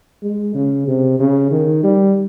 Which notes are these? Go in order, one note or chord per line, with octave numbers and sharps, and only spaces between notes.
G#3
C#3
C3
C#3
D#3
G3